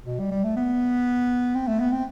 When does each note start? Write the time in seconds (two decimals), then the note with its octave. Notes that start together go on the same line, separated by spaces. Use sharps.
0.06 B2
0.19 G3
0.31 G3
0.43 A3
0.56 B3
1.55 C4
1.67 A3
1.80 B3
1.92 C4